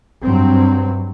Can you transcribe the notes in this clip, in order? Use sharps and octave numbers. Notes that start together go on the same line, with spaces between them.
G2 F#3 C4